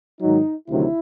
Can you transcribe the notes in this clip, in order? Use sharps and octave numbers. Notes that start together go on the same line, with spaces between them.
G#2 D#3 F#3 D#4
D2 C3 D#3 F#3 E4